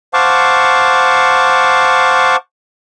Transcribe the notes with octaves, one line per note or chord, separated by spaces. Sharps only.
C5 F5 F#5 A5 C#6 D6